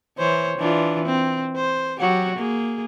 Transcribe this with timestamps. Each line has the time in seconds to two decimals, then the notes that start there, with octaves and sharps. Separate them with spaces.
0.18 E3 C5 C#5
0.57 E3 D4 F4
1.06 C4
1.56 C5
2.00 F#3 F#4 G4
2.36 A#3 G#4